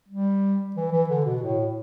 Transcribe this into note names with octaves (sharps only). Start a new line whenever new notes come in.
G3
E3
E3
D3
B2
A2